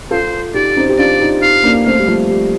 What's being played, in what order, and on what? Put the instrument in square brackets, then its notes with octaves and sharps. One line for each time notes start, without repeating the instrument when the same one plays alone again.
[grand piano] F4 A4 [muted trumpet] C5
[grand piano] D#4 G4 [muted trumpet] D5
[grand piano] C4 D#4
G4
[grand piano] D4 F4 [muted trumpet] D5
[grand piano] D#4 G4
[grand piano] D#4 G4 [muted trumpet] F5
[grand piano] A#3 D4
[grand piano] A3 C4 [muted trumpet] F5
[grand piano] G3
F3 A3
G3